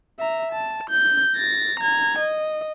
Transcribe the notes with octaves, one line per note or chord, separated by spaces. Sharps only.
E5 A#5
A5
G6
A6 A#6
A#5 G#6
D#5